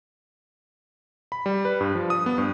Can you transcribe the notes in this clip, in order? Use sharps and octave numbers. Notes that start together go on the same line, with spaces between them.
B5
G3
B4
G2
F3
D#6
B3
G2